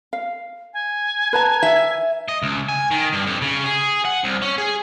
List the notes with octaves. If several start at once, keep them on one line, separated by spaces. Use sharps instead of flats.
F5
G#5
B4 A5 A#5
E5
D#5
C#2
G#5
D#3
G2
F2
C#3
G#4
F#5
C2
C#4
G#4